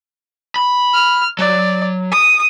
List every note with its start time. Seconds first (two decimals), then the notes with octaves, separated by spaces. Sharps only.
0.56 B5
0.93 F6
1.39 F#3 D5
2.11 D#6